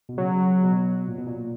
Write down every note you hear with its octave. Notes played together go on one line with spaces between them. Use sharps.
B2
C#3 F#3
B2
A#2
B2
A#2